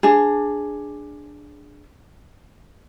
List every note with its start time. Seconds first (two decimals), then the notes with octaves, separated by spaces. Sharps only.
0.03 D4 G#4